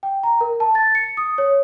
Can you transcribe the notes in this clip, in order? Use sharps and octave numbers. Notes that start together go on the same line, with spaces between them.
G5
A#5
A#4
A5
A6
C#7
D#6
C#5